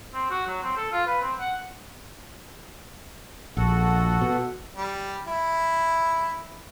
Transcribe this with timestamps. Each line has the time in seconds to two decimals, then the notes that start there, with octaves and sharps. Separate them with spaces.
0.14 C4
0.30 F#4
0.47 F#3
0.63 C4
0.77 A4
0.92 F4
1.07 B4
1.21 C4
1.39 F#5
3.57 A#1 F#4 A4 F#5
4.21 B2
4.77 G3
5.28 E4